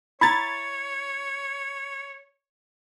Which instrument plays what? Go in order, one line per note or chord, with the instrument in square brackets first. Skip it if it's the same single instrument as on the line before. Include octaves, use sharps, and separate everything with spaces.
[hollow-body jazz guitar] E4 A#5 [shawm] C#5 [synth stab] B5 G#6 A6